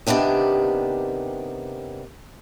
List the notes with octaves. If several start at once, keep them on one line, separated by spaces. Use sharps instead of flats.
C3 D#3 B3 D4 G4